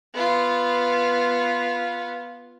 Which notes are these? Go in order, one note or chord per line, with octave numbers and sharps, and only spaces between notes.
B3 F4